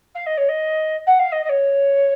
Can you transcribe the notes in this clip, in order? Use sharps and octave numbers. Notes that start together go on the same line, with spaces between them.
F5
D#5
C#5
D#5
F#5
F5
D#5
D#5
C#5